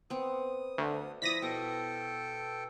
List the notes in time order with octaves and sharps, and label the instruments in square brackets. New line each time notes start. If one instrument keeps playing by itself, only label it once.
[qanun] B3 C4 [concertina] D#6
[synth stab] D2
[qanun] F3 E4 [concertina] D5 [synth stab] D#6 A#6 B6
[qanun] B2 [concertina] A4 G5